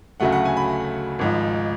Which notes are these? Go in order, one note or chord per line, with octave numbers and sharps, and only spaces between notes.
D2 C#3 F#3 A3 F#5
F#5
G#5
B5
G#1 G#2 F3